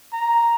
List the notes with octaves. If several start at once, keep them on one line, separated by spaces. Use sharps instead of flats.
A#5